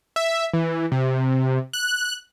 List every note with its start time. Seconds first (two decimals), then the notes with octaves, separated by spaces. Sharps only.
0.16 E5
0.54 E3
0.92 C3
1.73 F#6